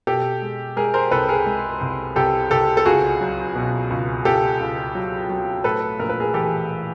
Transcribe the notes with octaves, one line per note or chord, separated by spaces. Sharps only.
B2 G4 A4
G#3
G#3 G#4 A#4
A#4 C5
C2 A4 B4
G#4 A#4
G#3
C2
C2 G4 A4
C2 G4 A4
A4
C#2 F#4 G#4
F#3
B2
C#2
C#2 G4 A4
C#2
F#3
F#3
A2 A4 B4
A#1 A#4
B4
G#4 A#4
E3 G4 A4